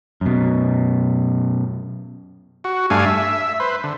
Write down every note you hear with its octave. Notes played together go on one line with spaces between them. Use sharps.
F#2 B2
F#4
G2 A3 D4 F5 G#5
E5
B4 C5
D3